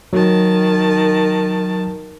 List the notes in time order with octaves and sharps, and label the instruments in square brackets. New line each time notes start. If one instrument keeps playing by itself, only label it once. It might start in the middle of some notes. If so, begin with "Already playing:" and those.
[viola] D#3 A5 [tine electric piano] F#3